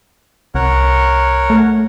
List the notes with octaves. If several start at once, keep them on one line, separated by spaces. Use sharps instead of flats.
C2 A#4 C#5 F#5
A3